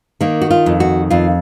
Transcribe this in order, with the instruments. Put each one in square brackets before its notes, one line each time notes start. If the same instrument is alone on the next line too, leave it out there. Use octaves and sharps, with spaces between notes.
[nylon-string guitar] D#3 A#3
F#4
F4
F2
F#4
F2 F4